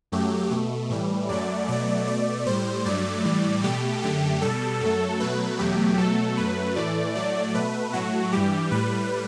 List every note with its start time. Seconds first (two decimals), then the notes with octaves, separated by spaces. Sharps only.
0.12 F#2 F#3 A3 G4
0.51 B2 A3
0.90 A2 E3 G3
1.29 F#2 F#3 A3 D5
1.68 B2 F#3 A3 D5
2.07 B2 A3 D5
2.46 A2 G3 C5
2.85 G2 F#3 A3 D5
3.24 A2 E3 G3
3.63 B2 A3 G4
4.02 F#2 D3 A3 G4
4.42 B2 G3 A4
4.80 F#2 F#3 A3 A4
5.20 B2 F#3 A3 B4
5.59 E2 B2 F#3 A3 G4
5.98 B2 F#3 A3 A4
6.37 F#2 F#3 A3 B4
6.76 A2 E3 A3 D5
7.15 A2 F#3 A3 D5
7.54 B2 A3 B4
7.93 A2 F#3 A3 F#4
8.32 G2 E3 G3 G4
8.71 A2 G3 B4